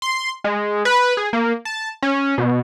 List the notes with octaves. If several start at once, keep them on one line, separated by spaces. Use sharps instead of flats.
C6
G#3
B4
G#4
A#3
A5
C#4
B2